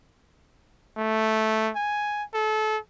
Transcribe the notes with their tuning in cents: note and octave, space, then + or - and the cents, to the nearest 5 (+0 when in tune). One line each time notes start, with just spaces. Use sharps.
A3 -5
G#5 +0
A4 -30